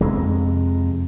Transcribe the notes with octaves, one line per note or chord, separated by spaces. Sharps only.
F2 C3 G#3